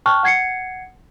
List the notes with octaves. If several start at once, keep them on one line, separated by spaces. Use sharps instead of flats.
G5 A5 C#6 F6 F#6
F#5 G#6 C7 C#7